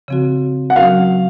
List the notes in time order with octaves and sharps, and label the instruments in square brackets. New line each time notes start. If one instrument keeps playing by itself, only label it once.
[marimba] C#3 F3 C4 F#4
[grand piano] F#5
[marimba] F#3 C#4 F#4 A#4 [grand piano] F5